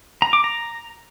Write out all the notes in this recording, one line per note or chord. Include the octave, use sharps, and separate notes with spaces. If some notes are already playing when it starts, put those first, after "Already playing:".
A#5
D6
A#5